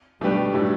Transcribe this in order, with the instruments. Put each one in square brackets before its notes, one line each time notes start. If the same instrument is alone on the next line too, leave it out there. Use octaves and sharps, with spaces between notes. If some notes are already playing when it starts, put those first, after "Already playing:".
[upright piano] B2 A3 D4 G4 B4 [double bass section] G3
[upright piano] A2 F#3 A3 D4